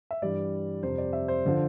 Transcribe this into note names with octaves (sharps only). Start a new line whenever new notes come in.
E5
G2 E3 G3 D5
F2 C3 G3 C5
D5
E5
C5
D3 F3